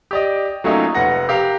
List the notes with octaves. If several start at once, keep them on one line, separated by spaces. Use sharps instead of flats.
G4 D5 D#5
F#3 A3 A#3 C#4 D#4 F4
F1 B4 F#5 A#6
G4 A#4 F5